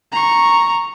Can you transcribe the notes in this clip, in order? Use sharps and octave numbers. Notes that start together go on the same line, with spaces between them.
A#5 C#6